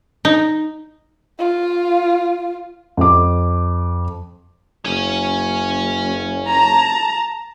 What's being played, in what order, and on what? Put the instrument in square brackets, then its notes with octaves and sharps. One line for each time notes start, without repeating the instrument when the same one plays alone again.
[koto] D#4
[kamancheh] F4
[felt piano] F2 D6
[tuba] F#1 [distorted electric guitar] C#5 G#5
[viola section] A5 A#5